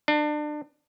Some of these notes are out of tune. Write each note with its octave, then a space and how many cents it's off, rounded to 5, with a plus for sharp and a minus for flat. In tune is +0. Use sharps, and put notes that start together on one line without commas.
D4 +30